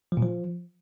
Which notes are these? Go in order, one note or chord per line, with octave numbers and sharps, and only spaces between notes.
F3
A#2
F3